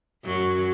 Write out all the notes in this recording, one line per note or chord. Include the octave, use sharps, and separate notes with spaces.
F#2 F#3